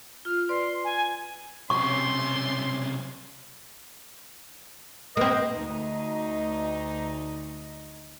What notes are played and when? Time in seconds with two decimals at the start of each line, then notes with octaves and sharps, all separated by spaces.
0.25 F4 F6
0.49 B4 D5 C6
0.84 G#5
1.70 B1 C3 A3 C#4 G4 C6 C#6
5.17 A#3 C4 B4 D#5
5.54 D2 D#4 D#5